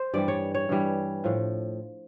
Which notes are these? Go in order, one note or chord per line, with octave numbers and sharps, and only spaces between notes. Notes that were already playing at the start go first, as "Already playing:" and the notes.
Already playing: C5
G2 E3 G3 D5
C#5
C#5
G2 E3 G3
A2 F3